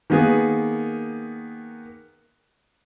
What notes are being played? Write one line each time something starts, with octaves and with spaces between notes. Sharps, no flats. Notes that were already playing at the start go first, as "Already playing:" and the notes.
D#3 A#3 B3 G#4